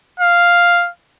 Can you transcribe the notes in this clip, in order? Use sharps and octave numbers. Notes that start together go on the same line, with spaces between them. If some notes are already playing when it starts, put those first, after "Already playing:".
F5